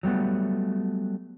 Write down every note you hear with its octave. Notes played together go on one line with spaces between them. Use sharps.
F#3 G3 A3 B3